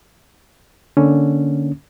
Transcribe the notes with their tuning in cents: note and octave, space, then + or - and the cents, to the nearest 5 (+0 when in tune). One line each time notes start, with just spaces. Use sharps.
D3 +0 A#3 +0 C#4 +0